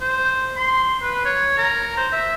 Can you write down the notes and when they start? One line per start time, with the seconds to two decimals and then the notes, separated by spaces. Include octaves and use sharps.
0.01 C5
0.57 C6
1.02 B4
1.25 C#5
1.58 A#4
1.97 C5
2.12 E5